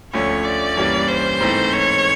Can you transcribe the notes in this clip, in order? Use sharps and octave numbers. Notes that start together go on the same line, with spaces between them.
D2 D3 F3 A3 C#4 C#5
D5
G2 E3 G3 A#3 C#4
C5
G#2 E3 A3 C4
C#5